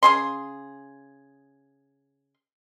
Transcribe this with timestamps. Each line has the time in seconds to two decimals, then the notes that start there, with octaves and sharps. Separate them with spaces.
0.03 C#3 G#4 C6